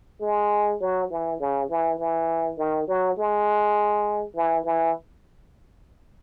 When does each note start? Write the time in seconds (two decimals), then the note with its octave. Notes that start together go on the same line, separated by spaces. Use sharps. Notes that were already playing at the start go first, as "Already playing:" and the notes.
0.21 G#3
0.81 F#3
1.10 E3
1.40 C#3
1.70 E3
1.99 E3
2.58 D#3
2.88 F#3
3.18 G#3
4.36 E3
4.65 E3